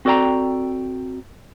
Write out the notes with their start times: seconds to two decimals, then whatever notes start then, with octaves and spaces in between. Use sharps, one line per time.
0.05 C4 F#4 A4 D5 G5 A#5